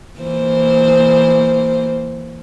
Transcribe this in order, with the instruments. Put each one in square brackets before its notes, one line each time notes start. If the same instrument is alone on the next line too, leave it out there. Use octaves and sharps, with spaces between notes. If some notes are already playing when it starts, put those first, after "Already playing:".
[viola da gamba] E3 A#3 C5